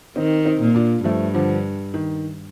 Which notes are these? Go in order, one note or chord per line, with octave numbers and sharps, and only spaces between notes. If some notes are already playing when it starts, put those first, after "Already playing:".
D#3 C4 D#4
C4 D#4
A#2
D4 F4
G2 F3 A3
D3 F3
D#3